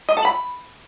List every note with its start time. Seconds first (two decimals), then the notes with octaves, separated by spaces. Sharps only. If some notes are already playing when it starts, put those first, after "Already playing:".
0.09 D#5
0.17 A4
0.25 B5